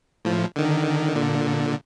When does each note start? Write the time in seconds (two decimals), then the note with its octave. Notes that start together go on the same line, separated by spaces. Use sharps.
0.25 A2 F3
0.56 D3 D#3
1.16 A#2 D3